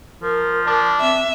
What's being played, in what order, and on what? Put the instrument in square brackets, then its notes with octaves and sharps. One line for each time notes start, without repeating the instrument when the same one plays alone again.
[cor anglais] F3 [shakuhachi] A#4
[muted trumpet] D4
[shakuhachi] C4 [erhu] E5